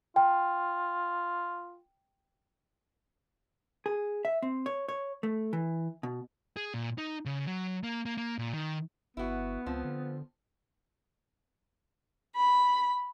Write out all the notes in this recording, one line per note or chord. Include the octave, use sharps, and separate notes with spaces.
F4 G5
G#4
E5
C4
C#5
C#5
A3
E3
B2
G#4
A#2
D#4
C#3
F#3
A#3
A#3
A#3
A#2
D#3
G1 B3 E4 F#4
C#2 F3 C4 F4
D3
B5